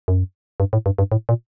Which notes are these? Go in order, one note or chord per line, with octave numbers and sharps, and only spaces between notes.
F#2
G2
A2
G2
G2
A2
A#2